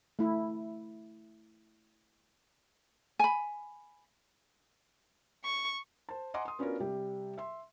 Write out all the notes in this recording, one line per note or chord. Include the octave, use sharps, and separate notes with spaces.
A3 E4
G#5 B5
C#6
C5 A5
D#5 F#5 G#5 A#5 C6 D6
C6 D#6
B3 C#4 D4 F4 F#4 A#4
C3 G3 G4
E5 C6